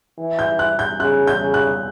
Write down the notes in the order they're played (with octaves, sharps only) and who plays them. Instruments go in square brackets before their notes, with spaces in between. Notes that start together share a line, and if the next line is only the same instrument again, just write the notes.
[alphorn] E3
[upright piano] G6
F#6
G6
[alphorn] C#3 [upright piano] F#6
[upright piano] G6
[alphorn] C#3
[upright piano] F#6